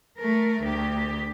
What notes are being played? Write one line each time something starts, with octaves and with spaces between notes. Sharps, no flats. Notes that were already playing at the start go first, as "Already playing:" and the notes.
A3 A#4
D2 G4